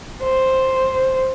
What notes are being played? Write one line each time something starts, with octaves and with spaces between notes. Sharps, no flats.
C5